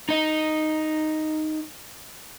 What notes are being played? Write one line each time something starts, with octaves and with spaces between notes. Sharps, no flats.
D#4 D#5